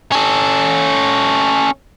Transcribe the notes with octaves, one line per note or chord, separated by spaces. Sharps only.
C#4 A4